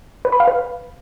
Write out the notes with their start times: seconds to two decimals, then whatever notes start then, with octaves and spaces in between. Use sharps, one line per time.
0.25 B4
0.32 B5
0.40 F5
0.48 B4